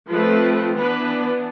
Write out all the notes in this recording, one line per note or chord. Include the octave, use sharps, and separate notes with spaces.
F3 A3 C4 B4
E3 B3 D4 B4